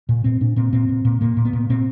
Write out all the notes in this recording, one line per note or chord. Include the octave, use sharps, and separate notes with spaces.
A#2
A#2 C4
A#2 D4
A#2 C4
A#2 C4
A#2
A#2
A#2 A#3
A#2
B3
A#2
A#2 C4